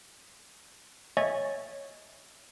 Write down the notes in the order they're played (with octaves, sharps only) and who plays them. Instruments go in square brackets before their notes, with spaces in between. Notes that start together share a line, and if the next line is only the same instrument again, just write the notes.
[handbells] C#5 D#5 E5 G#5 C#6 A6